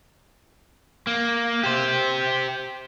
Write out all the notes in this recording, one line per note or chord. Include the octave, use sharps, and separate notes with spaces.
A#3
G4 C5